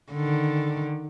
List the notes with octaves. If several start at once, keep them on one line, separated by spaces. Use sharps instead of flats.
D3 D#3